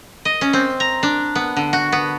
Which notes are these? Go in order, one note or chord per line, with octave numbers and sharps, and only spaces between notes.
D#5
C#4
C4
A#5
D4
B3
D3
F#4
B3